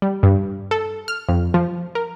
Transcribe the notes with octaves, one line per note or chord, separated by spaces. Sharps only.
G3
G2
A4
F6
F2
F3
A#4